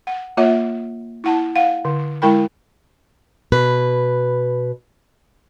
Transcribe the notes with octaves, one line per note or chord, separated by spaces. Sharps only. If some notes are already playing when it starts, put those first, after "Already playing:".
F#5
A#3 F4 C#5 E5 F#5
E4 F#5 A5
F5 F#5
D3
G#3 E4 A#4 G5 B5
B2 B4